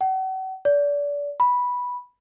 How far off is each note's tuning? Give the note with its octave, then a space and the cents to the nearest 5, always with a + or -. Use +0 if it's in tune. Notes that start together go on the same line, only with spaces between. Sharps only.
F#5 +40
D5 -30
B5 -5